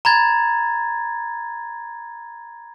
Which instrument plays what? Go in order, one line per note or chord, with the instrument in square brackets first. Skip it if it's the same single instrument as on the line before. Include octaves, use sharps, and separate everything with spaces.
[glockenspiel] A#5 B5 G#6 A6